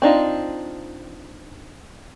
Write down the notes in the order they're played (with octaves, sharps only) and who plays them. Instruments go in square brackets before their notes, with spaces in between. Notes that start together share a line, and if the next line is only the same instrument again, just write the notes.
[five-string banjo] C4 D4 D#4 F4